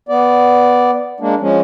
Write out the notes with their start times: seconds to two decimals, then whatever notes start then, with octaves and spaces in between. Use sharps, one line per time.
0.09 B3 D5
1.20 G#3 A#3 D4
1.41 F3 G#3 C#4